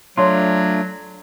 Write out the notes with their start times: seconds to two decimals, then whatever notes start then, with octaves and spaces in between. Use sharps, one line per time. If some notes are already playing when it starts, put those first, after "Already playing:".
0.17 F#3 A3 D4 F4 C#5 C6